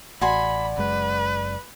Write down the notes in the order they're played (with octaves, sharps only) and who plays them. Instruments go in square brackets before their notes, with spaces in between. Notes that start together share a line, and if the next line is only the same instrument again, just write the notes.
[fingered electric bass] A1 [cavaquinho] F#4 G#5 C6 [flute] D5 [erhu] B5
[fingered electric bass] F#1 F#2 G#3 [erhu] B4